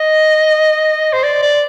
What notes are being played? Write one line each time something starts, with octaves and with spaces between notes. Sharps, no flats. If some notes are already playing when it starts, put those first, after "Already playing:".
Already playing: D#5
C5
D5
D5